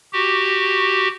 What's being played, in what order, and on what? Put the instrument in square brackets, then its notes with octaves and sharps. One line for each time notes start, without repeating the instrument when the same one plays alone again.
[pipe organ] F#4 G4